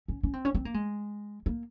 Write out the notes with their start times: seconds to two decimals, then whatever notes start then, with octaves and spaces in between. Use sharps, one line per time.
0.08 C#4
0.23 C#4
0.33 C4
0.45 C#4
0.55 C4
0.65 A#3
0.74 G#3
1.46 A#3